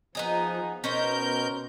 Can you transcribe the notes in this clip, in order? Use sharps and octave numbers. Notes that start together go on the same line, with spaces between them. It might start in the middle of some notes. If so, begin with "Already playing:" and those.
F3 B3 D#4 G#4
B2 C#4 D#4 A#4 C5 G6